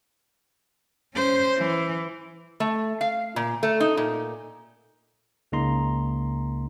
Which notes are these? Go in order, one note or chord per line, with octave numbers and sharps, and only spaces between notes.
C#4 C5
E3
A3
F5
A#2
A3
D#4
A#2
C#2 C#3 A#3 D#4 A#5 C6